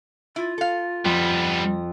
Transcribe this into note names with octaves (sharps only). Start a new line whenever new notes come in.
E4 F4
A4 F5
F2 G3 B3